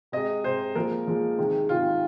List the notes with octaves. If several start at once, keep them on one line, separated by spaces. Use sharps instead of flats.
C3 G#3 D#5
C3 G#3 C5
A#2 F3 G#3 A#4
A#2 F3 G#3
C3 D#3 G#3
C3 D#3 G#3 F4